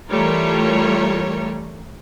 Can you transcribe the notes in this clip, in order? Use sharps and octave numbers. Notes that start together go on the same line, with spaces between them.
E3 G3 A3 F4 A#4 C#5